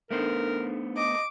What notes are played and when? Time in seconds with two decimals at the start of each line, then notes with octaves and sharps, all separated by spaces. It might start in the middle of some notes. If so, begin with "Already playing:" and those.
0.11 A3 B3 D4 D#4 A4 A#4 C5
0.97 D#5 D6